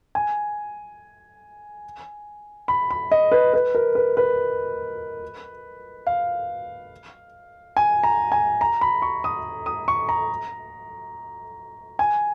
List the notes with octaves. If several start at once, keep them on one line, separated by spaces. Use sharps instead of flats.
G#5
B5
B5
D#5
B4
B4
A#4
B4
B4
F5
G#5
A#5
G#5
A#5
B5
C#6
D#6
D#6
C#6
A#5
G#5